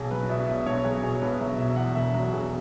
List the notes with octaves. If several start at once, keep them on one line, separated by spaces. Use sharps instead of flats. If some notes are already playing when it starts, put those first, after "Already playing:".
Already playing: B1 G#4
F#3 B4
B2 E5
B1 E5
B1 C#5
F#3 G#4
B2 G#4
B1 B4
F#3 E5
B2 E5
E5
E2 F#5
E1 E5
F#3 F#4
B2 G#4